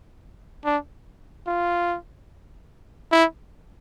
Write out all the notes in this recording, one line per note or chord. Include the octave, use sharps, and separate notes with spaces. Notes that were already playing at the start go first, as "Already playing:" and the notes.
D4
F4
E4